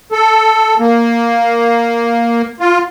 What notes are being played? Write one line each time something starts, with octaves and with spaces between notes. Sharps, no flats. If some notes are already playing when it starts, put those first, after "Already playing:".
A4
A#3
F4